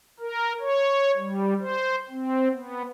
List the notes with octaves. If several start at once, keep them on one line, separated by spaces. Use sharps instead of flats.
A#4
C#5
G3
C5
C4
B3